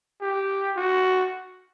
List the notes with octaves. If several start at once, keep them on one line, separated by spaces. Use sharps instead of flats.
G4
F#4